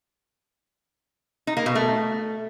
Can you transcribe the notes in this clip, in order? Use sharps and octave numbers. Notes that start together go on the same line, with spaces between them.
D#4
A#3
B2
A3